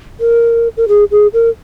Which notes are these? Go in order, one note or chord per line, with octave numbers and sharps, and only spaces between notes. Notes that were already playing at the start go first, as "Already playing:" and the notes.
A#4
A#4
G#4
G#4
A#4